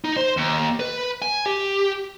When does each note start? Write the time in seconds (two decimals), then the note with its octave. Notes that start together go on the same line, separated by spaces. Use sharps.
0.05 D#4
0.17 C5
0.37 D#2
0.80 B4
1.22 G#5
1.46 G4